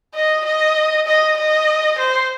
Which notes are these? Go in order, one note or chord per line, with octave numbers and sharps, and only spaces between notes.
D#5
D#5
D#5
D#5
C5